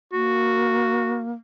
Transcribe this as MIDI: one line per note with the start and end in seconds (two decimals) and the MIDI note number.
0.13 1.32 58
0.13 1.22 66